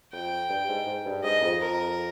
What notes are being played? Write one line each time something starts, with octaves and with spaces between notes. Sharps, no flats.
F2 G5
G2
G#2
G#2
G2
G#2 D#5
F2
F2 A#4